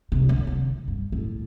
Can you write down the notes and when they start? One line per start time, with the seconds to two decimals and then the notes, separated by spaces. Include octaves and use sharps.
0.12 C3
0.29 D3
0.47 C3
0.88 G2
1.12 A2